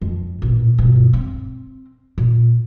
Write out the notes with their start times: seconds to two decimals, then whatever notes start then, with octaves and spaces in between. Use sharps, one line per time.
0.01 F2
0.42 A1 A#2
0.78 G2 B2
1.13 C4
2.18 A#2